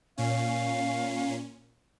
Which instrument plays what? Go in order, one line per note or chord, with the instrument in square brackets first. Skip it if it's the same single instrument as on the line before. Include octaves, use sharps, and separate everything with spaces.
[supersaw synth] A#2 C#4 [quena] F5